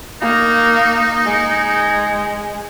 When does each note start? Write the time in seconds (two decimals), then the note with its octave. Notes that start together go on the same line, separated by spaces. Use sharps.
0.21 A#3 D#4
1.25 G#3